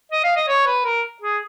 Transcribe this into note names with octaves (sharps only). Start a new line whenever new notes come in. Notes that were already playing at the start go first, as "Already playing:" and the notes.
D#5
F5
D#5
C#5
B4
A#4
G#4